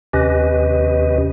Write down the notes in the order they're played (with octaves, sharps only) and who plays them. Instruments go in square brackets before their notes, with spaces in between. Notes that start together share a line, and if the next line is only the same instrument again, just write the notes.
[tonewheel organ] D#2 C3 C#4 G4 B4 D#5